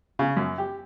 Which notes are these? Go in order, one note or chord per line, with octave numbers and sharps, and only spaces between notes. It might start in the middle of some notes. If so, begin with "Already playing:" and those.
C#3
F#2
G4